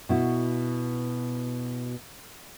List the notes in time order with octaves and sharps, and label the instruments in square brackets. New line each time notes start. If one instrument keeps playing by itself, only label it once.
[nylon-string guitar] B2 E4 F#4